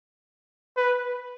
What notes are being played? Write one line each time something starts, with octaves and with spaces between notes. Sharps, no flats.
B4